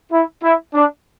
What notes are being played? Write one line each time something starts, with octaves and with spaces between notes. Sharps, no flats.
E4
E4
D4